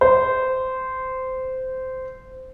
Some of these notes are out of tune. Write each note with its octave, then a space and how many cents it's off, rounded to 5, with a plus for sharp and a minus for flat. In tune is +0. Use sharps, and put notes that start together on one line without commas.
C5 -15